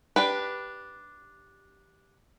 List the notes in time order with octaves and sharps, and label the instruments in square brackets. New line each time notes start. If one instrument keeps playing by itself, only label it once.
[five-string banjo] D4 G4 B4